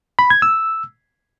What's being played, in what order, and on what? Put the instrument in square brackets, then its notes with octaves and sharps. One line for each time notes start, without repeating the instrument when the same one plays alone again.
[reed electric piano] B5
G#6
E6